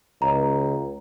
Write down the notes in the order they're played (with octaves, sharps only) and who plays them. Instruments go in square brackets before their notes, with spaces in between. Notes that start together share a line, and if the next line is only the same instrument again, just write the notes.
[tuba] C#2 [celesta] A#5